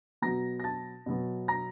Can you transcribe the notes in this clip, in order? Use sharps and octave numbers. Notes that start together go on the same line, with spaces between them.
B2 F#3 B3 A#5 A#6
A#6
A5 A6
B2 F#3 B3
A#5 A#6